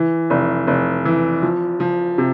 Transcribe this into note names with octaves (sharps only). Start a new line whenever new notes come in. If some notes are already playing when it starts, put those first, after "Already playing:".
Already playing: E3
F1
F1
E3
F3
F3
C3